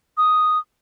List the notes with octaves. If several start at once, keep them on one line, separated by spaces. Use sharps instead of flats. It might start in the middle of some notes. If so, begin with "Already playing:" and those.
D#6